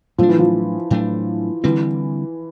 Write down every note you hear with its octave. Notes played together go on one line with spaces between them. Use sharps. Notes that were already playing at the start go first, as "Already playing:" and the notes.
A2 F3 F#3 A3 D4
E3
F3
A2 F#3 A3 D4
D3 E3 G3 C4